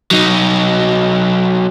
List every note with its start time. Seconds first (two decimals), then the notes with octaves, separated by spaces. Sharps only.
0.11 F#3 D#4